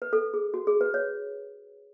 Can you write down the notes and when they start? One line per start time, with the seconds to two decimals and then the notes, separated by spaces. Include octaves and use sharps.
0.02 B4
0.13 A4
0.34 G#4
0.54 F#4
0.67 G#4
0.81 B4
0.94 C#5